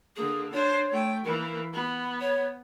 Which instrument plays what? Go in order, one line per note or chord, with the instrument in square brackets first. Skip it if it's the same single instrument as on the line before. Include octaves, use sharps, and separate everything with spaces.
[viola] D3 A#3 [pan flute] G#4
[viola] D4 C5 [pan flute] C#5
[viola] A3 G5
[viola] E3 A#3 [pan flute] A#4
[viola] B3 [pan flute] B5
[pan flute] C#5